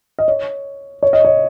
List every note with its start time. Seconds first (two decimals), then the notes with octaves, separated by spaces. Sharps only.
0.19 D#5
0.28 C#5
1.03 C#5
1.13 D#5
1.25 C#5